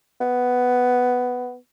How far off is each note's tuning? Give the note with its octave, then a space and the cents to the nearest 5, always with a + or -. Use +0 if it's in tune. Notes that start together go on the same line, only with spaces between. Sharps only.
B3 +5